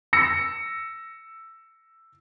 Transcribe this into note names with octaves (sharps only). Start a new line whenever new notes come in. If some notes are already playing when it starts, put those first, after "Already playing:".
E6 A#6 C#7